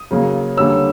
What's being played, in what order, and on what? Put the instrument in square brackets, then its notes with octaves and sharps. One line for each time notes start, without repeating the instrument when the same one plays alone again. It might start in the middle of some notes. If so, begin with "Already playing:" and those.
Already playing: [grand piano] D#6
C#3 F#3 A#3 C#4
D3 G3 A#3 C#4 E6